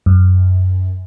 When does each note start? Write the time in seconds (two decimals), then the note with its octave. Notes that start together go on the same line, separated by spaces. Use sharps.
0.06 F#2